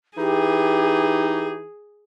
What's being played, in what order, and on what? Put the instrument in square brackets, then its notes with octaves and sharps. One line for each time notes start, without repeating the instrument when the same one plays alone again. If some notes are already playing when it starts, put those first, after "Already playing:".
[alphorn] E3 [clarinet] D#4 [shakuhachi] G4 [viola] G#4